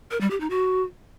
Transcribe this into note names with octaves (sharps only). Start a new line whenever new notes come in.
A#4
G3
G4
D#4
F#4